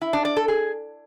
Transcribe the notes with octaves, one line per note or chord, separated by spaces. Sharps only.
E4
D4
D5
A4
G#4